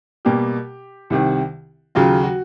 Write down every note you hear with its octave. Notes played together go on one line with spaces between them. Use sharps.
B2 G3 A#3 G4
C2 C3 D#3
D#2 C#3 F#3 F4
F#4